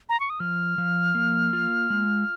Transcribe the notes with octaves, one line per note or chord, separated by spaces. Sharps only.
A#5
C#6
D#6
F3 F6
F3
A#3
F4
G#3